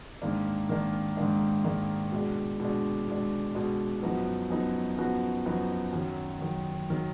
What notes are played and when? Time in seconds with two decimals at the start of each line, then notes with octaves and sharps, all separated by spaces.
0.22 G#2 D#3 A#3 D4
0.69 G#2 D#3 A#3 D4
1.17 G#2 D#3 A#3 D4
1.64 G#2 D#3 A#3 D4
2.12 B2 G#3 D4
2.60 B2 G#3 D4
3.07 B2 G#3 D4
3.55 B2 G#3 D4
4.02 F#2 F3 B3 D#4 F#4
4.51 F#2 F3 B3 D#4 F#4
4.98 F#2 F3 B3 D#4 F#4
5.46 F#2 F3 B3 D#4 F#4
5.93 F#2 D#3 F#3
6.41 F#2 D#3 F#3
6.90 D#3 F#3